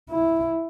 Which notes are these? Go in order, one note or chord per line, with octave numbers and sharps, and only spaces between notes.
E4